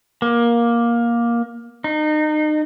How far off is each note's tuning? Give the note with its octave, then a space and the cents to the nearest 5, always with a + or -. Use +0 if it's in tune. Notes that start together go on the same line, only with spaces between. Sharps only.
A#3 +15
D#4 -30